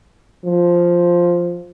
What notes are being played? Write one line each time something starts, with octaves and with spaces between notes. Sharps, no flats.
F3